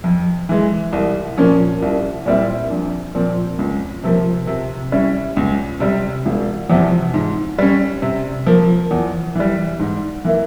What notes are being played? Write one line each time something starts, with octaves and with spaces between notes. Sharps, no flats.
F2
E3 G#3
C2
A#2 F3 A#3 C#4
C2
A#2 G3 C4 E4
A#1
A#2 F3 C4
C#2
C3 F3 A#3
C3
G3 C#4 E4
C#2
C3 G3
E1
E2 C3 F3
G#2
G3 C#4
C3
F3 A#3
E2
E3 G3
G#2
E3 A#3 E4